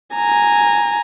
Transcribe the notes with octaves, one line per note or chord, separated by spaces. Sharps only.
G#5 A#5